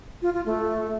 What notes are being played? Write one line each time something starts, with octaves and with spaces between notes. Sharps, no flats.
F4
F4
A3